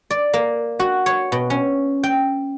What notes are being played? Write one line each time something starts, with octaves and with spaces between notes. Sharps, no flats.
D5
A#3
F#4
C#5
B2
C#4
G5